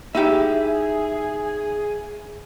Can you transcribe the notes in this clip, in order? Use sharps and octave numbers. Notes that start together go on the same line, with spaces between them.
D#4 E4 G4 G#4 E5